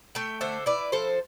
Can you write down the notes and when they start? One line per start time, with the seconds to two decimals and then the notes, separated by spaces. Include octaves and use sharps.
0.15 A3 E5 G5
0.41 D3 C5 E5
0.66 E4 B4 D5
0.92 F3 A4 C5